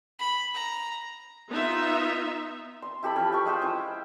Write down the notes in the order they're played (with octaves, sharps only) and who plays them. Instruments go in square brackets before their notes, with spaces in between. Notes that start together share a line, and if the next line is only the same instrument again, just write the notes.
[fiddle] B5
A#5
[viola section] B3 D#4 F4 E5
[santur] C6
E4 G4 A4 B5
F3 C#4
G5 C#6
G#3 F4 C5 G5
C#4 E4